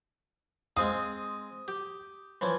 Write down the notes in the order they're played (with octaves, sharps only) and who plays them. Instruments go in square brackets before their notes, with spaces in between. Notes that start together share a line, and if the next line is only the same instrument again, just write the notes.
[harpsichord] G#3 C4 F5 [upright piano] D#6
[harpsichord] G4
E3 F3 C#4